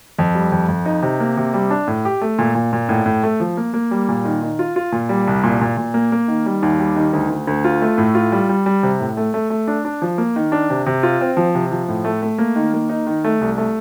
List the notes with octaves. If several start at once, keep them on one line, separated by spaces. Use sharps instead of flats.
F2
G3
F2
F2
D#4
C3
A#3
C3
G3
D4
A2
G4
A3
A#2
A#2
A#2
A2
A2
A3
F3
A#3
A#3
G3
A#2
D#3
D#3
F4
F4
A#2
G3
C2
A#2
A#2
A#2
A#3
A#3
D#3
G3
D#2
G3
D#3
D2
D2
D2
F4
A3
A2
F4
G3
G3
G3
C3
A2
A3
A3
A3
D4
D4
F3
A#3
D#3
D4
C3
C3
F4
C4
F3
C3
F3
A2
A3
A3
A#3
D#3
A#3
D#4
D#3
A3
C2
A3